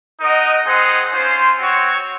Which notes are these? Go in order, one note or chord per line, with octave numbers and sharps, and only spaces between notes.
D#4 A#4 D#5 F#5
C4 D#4 G#4 C5 F#5
C#4 F4 C5
C4 F#4 C#5